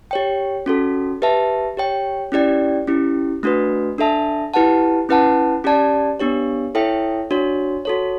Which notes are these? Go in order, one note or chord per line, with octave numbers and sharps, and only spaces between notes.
G4 C#5 G5
C#4 F#4 A4
G4 B4 E5 A5
G4 C#5 G5
C#4 E4 G4 D5 G5
C#4 E4 G4
A3 D4 F#4 B4
D4 A4 E5 A5
E4 G4 B4 F#5 A5
C#4 E4 B4 F#5 A5
C#4 G4 D5 A5
B3 D4 G4 C#5
E4 A4 C#5 E5 G5
D4 F#4 C#5
F#4 A4 C#5